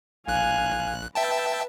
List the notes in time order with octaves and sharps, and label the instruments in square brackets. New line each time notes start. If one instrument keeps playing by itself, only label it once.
[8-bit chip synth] A#1 F#6 [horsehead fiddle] F5 G#5
[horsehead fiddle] B4 [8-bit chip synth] E5 G5 A5